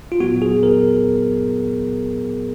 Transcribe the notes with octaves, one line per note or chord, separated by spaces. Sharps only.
F4
A#2 F#3 B3 F#4
G#4
A#4